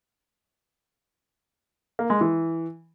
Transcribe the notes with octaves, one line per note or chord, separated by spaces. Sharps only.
A#3
G#3
E3